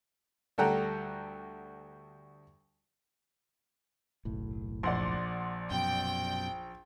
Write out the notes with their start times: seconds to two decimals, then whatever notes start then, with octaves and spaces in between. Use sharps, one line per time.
0.58 D2 G3 A4 F#5 G5 A#5
4.25 F#1 B1 A2
4.83 A#1 D5 F#5 C6
5.71 F#2 B2 G5